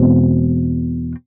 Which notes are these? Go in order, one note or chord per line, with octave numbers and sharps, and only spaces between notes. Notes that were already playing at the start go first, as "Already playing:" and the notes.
Already playing: E2 B2 G#3 C4